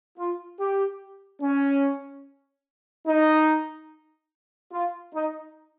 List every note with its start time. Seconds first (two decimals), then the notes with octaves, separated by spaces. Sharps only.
0.18 F4
0.60 G4
1.41 C#4
3.07 D#4
4.71 F4
5.14 D#4